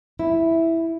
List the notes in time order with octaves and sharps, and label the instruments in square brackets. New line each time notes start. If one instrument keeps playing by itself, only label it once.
[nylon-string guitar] E4